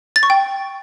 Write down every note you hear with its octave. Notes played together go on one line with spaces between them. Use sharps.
A6
C#6
G5